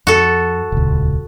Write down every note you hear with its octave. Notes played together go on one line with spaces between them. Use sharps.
F2 F#4 A4
D#1 C#2